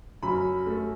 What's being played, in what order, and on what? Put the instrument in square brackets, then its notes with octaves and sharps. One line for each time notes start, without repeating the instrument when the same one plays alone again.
[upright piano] F#2 B5
A3